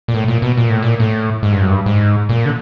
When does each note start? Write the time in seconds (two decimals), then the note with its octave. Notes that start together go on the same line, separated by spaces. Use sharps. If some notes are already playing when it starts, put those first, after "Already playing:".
0.08 A#2
0.14 A2
0.28 A#2
0.42 B2
0.57 A#2
0.70 A2
0.83 A#2
1.00 A2
1.43 G#2
1.52 G2
1.61 F#2
1.70 G2
1.86 G#2
2.29 A#2
2.46 D3